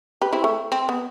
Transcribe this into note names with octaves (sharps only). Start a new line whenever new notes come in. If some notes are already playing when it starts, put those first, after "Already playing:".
G4 B4
C4 E4
A3
C4
B3